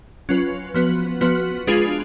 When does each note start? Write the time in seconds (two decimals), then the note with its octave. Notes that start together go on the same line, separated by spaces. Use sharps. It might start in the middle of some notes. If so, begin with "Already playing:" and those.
0.29 F#3 C#4 F4 B4
0.74 F3 B3 F#4 B4
1.21 F3 B3 F#4 B4
1.67 G#3 D4 F4 G#4 B4